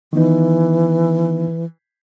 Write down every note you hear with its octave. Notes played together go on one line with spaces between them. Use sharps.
D#3 E3 B3 D#4